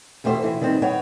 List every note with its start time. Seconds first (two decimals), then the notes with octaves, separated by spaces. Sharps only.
0.24 E2 B2 A3 G4 C5
0.43 E3 E4
0.61 D#3 G3 B3 C4
0.82 B3 C#5 G5